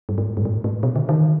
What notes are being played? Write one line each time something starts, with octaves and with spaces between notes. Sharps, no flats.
G2
G#2
G2
A2
G#2
A2
B2
D3
D#3